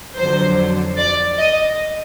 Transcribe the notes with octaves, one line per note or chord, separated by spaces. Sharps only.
F2 D3 F#3 C5
D5
D#5